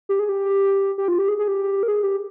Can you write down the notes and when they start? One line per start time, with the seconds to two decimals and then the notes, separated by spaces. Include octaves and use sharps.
0.09 G4
0.19 G#4
0.29 G4
0.98 G4
1.08 F4
1.18 G4
1.28 G#4
1.39 G#4
1.48 G4
1.83 A#4
1.88 G#4
2.03 G4